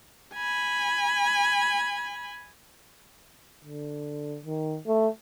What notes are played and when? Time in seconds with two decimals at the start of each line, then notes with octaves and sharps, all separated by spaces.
0.35 G#5 B5
3.64 D3
4.45 D#3
4.87 A3